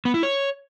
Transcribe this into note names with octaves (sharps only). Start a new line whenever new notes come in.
B3
E4
C#5